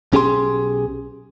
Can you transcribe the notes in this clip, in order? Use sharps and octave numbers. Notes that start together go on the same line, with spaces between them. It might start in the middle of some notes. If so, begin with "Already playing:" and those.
B1 C#4 G4 G#4 G#5 C6